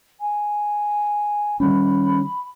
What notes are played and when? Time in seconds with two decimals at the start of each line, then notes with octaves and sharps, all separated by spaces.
0.20 G#5
1.60 D#3 G3 C#4 B5